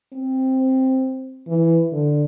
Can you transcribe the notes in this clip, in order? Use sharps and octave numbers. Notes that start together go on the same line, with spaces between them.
C4
E3
D3